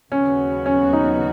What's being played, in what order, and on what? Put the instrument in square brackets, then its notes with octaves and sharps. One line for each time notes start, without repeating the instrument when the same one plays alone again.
[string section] D#2 C#3 F#3 B3 F#4 [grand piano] C#4
[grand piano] C#4
D#4